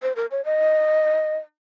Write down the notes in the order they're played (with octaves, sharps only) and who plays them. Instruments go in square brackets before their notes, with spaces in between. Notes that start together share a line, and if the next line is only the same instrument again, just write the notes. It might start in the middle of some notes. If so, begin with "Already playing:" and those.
[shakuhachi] C5
A#4
C#5
D#5